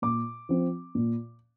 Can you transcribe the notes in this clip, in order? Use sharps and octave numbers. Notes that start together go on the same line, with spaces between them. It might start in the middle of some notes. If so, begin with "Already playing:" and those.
A#2 D6
F3 C4
A#2